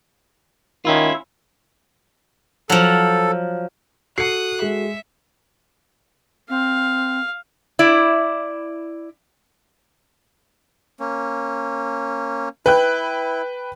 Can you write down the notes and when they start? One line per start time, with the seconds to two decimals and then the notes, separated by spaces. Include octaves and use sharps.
0.85 D#3 C#4 E4 F4
2.70 F3 F#3 A4
4.18 F#4 A4 D#6 F#6 C7 C#7
4.62 G#3 E5
6.50 C4 F5
7.79 E4 D5
11.00 A#3 C#4
12.66 E4 B4 G5 F#6